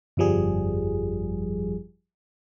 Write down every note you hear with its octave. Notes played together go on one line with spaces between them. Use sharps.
G1 F2 F3 G3 G#4